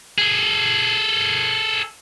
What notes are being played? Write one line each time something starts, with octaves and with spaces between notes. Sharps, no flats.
G#4 A4